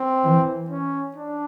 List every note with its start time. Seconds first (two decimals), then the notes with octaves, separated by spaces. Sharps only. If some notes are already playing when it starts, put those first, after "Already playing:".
Already playing: C4
0.24 E3
0.71 C#4
1.17 D4